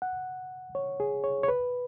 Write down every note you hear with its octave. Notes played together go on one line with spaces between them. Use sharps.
F#5
C#5
G#4
C#5
C#5
B4